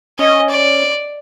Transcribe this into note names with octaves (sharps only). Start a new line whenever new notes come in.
C#4 D#5
D5